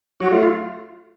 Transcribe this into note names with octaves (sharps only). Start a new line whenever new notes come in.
F#3 F#4
A3 F4
F4